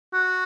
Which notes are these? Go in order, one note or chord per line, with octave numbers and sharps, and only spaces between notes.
F#4